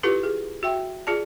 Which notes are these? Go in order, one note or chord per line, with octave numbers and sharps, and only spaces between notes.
E4 F4 G4 A4 B4
G#4
F#4 E5 G5
F4 G#4 D5 A5